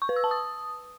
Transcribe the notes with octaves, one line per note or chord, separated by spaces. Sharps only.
C#6
B4
E6
A5
D#6